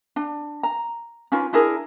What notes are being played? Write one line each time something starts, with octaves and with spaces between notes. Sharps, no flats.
D4
A#5
C#4 D#4 F4 B4
D4 E4 G#4 A#4